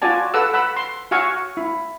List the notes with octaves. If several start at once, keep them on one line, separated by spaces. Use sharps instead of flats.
F4 F#4 D5 G#5 A5
A4 B4 F#5 E6
F#5 B5 E6
C6
F#4 F5 G#5 C#6 E6
E4